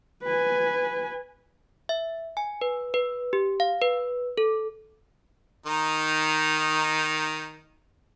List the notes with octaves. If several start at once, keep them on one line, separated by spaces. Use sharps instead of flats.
B4 G#5
E5
G#5
B4
B4
G4
F5
B4
A4
D#3 D#4